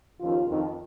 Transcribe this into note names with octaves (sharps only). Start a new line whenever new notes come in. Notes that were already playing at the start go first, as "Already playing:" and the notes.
D#2 C#3 F3 F4
F2 D#3